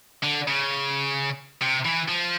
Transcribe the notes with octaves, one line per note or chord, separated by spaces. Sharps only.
D3
C#3
C3
E3
F3